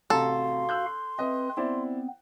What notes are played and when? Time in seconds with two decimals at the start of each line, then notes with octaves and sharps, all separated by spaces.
0.10 A1 C3 F#4 A4 F5 A#5 C6
0.69 E6 F#6 G6
1.19 C4 B4 D#5 E5
1.57 B3 C4 E4 C5 D5